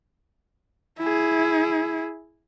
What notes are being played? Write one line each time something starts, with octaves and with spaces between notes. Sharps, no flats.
E4 G#4